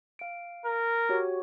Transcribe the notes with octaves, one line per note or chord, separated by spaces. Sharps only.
F5 D7
A#4
F#4 G4 C#5